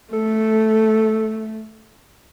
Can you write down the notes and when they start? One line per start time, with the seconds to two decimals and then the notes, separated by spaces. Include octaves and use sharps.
0.13 A3 A4